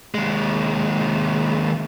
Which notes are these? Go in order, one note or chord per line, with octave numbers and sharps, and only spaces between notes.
D#2 G#3